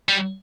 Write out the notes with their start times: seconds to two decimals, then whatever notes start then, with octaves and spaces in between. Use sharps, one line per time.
0.09 G3